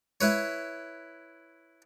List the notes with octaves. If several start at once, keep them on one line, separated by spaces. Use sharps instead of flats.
E4 B4 C#5